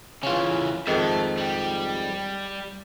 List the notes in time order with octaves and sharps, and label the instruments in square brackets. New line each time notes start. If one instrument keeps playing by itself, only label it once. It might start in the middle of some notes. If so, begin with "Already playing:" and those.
[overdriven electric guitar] C#3 E3 [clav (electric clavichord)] C#4 F4
[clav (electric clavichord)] F2 G#2 D#3 [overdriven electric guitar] E5 A5
[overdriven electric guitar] G3